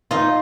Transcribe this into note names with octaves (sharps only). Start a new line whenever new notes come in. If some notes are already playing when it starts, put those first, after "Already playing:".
D#4 F4